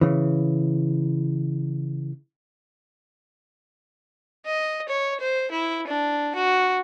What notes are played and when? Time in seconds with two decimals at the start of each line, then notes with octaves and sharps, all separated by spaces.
0.01 C#3 E3
4.46 D#5
4.89 C#5
5.20 C5
5.51 E4
5.87 D4
6.35 F#4